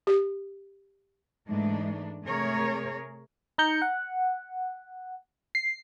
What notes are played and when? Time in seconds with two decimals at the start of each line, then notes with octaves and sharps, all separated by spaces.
0.07 G4
1.48 G#2 E3 G#3 A3 D4 D#4
2.24 C3 A3 G#4 A#4 C#5
3.58 D#4 A#5 G6 C#7
3.82 F#5
5.55 C7